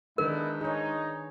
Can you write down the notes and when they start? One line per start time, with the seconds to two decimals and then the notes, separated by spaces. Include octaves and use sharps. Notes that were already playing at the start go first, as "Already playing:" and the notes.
0.18 G#2 D#3 B3 D4 E4 A#4 B4 D#5
0.61 D#4 G#4 C#5